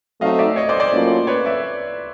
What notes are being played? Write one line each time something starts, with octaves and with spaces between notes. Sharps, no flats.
F#3 A3 C4 D#4 D#5 F5
D5 E5
C#5 D#5
C5 D5
C5 D5
A2 F#3 A#3 C#4 F4
B4 C#5
D5 E5